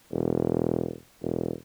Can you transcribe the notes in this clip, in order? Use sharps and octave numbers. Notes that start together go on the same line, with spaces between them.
E1
E1